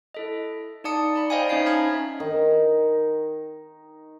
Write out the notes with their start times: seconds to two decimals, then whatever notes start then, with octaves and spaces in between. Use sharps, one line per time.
0.14 E4 A4 D#5
0.84 D#4 D5 F5 A5 D#6 C#7
1.16 D5 B5
1.29 C5 D#5 F5 G5 G#5 B5
1.49 C#4 D#4 C#5 D#5 F5 C7
1.65 E5 A5 B5 F6 G#6
2.20 D#3 D#4